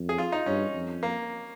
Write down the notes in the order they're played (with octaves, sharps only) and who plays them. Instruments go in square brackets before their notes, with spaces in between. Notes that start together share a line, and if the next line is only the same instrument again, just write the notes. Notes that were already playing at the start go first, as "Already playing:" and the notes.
Already playing: [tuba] F2
[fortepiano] G#4
F4
D#4
[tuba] G2 [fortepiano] C#4
[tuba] F2
[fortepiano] A#3